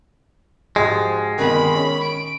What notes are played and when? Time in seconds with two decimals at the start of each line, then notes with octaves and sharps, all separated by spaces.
0.76 G#2 F3 G#3 F#4 G4
1.38 G1 C3 D#3 B5
1.72 C#4 C#6
2.02 D7